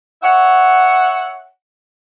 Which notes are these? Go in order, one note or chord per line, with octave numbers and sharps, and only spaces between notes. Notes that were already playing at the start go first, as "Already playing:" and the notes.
C#5 E5 F#5